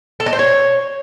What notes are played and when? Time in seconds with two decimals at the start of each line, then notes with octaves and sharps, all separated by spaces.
0.20 A4
0.26 D#5
0.33 C5
0.39 C#5